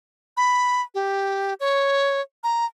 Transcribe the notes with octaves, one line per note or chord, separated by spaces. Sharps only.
B5
G4
C#5
A#5